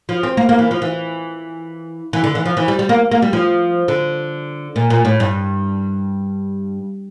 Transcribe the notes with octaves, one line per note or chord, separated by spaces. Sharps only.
F3
C4
A#3
A#3
E3
F3
E3
E3
D3
E3
F3
E3
G3
G3
A#3
A#3
G3
F3
D3
A#2
A#2
A2
G2